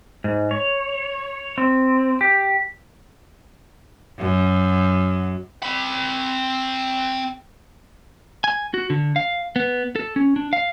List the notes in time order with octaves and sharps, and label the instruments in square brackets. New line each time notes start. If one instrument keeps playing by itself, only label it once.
[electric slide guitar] G#2
C#5
C4
G4
[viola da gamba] F#2
[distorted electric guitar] C4 B5
[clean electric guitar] G#5
F#4
D3
F5
B3
A4
C#4
D4
F5